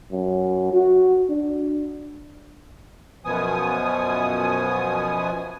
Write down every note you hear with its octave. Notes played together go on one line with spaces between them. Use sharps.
F#2
F#4
D4
F#2 B2 F3 B3 G#5 D#6